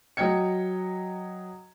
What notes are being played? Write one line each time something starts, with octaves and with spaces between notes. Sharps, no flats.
F#3 D#5 G5 G#6 C#7